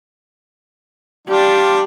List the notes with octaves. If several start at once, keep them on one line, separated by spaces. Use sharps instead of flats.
G3 D4 F4 G4